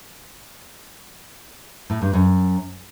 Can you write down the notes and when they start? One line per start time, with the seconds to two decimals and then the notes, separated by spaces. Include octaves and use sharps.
1.90 A2
2.02 G2
2.13 F#2